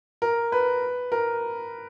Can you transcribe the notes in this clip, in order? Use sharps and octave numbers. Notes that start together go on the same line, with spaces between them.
A#4
B4
A#4